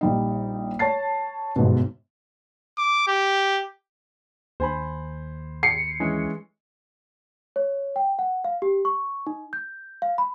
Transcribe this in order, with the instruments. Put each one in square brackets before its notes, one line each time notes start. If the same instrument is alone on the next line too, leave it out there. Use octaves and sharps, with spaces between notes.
[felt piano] A#1 G3 D#4
C#5 A5 A6 C7
G1 G#2 B2
[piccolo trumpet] D6
G4
[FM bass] D#2 [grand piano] C5 G#5 B5
[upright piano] C7 C#7
[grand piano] E3 G#3 C#4
[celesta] C#5
G5
F#5
F5
G4
C#6
D#4
G6
F5
B5